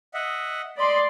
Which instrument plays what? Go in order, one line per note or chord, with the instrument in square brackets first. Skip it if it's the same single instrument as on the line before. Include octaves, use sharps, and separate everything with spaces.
[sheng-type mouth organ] D#5 E5 F#5
[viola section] D5 C6 [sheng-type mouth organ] D#5 B5